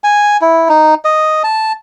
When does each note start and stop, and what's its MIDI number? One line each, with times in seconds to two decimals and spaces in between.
0.04 0.37 80
0.42 0.68 64
0.69 0.94 63
1.05 1.43 75
1.44 1.72 81